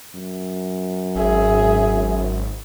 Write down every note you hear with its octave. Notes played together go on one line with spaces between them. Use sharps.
F#2
G#1 G#4 E5